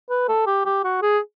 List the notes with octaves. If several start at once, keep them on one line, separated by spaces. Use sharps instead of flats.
B4
A4
G4
G4
F#4
G#4